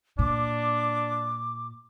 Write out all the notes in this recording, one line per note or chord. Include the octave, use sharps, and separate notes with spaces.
A#2 D4 D6